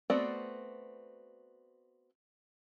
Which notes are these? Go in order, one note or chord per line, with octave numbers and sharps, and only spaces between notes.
A3 B3 C4 F#4 D5